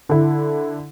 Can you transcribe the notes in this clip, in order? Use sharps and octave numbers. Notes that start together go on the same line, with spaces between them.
D3 E4